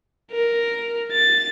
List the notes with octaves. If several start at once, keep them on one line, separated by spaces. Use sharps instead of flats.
A#4
A6